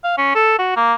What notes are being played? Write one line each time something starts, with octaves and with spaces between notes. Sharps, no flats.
F5
C#4
A4
F#4
A#3